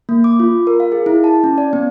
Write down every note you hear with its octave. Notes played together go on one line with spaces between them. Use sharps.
A#3
D6
F4
A#4
F5
G#4
E4
A5
C#4
D5
B3